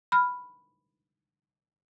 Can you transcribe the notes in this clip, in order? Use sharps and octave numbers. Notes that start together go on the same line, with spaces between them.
B5 F6